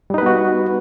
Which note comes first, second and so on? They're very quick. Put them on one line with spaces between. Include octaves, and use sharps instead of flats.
G3 D#4 B4 B3 F#4